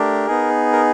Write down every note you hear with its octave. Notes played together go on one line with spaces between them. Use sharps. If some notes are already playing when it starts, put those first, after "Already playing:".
Already playing: A3 D4 G4 A#4
B3 D#4 G#4
A#4